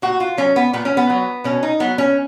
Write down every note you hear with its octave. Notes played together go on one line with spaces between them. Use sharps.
A#2 F#4
F4
F#3 C#4
B3
A#2 B3
C#4
B3
F#3
B2 C#4
D#4
F#3 B3
C#4